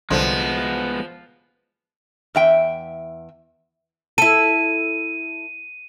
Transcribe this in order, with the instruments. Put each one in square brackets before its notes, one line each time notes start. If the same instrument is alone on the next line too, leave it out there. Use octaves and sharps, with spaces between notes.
[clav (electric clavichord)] C2 D3 [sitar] F3 [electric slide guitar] G#3 B3
[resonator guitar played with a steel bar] E2 E5 G5
[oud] E4 A4 [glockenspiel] D#7